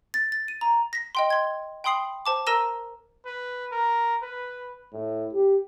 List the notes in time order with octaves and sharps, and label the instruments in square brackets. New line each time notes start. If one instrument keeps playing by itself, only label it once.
[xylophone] A6
A6
D#7
A#5
A#6 B6
D#5 G5 C6
C6 G#6
G5 B5 C6 D#6 C7 F#7
C5 A5 D6
A#4 A#5 E6 A#6 D#7 E7
[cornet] B4
A#4
B4
[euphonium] A2
G4